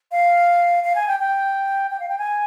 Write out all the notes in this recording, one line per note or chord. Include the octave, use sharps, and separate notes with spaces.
F5
F5
G#5
G5
G5
G5
F5
G5
G#5